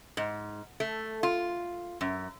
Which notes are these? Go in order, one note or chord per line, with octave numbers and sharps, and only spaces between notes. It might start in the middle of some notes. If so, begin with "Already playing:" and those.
G#2
A3
F4
F#2